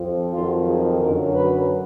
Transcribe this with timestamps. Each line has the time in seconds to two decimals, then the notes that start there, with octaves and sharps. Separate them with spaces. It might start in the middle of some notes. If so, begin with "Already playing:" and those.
Already playing: F2 F3
0.33 F2 D#3 F#3 F4
0.67 G#4
1.01 F#2 D3 F#3 A#4
1.35 B4